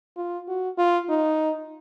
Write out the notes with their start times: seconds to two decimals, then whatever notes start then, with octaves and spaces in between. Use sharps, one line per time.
0.17 F4
0.48 F#4
0.78 F4
1.09 D#4